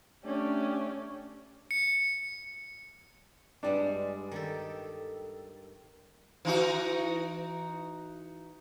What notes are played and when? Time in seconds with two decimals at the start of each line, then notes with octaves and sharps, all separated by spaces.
0.23 A3 C#4 D4 G4
1.71 C#7
3.63 G2 G3 G#3 D4
4.32 D#3 G4 A4
6.45 E3 D#4 F#4